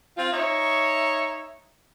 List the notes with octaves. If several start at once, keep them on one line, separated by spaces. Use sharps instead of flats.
C4 F4
D#4 C#5 E5